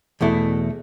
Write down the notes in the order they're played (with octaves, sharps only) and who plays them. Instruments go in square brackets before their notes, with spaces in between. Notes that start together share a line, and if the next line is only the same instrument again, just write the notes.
[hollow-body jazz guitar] E2 B2 A3 E4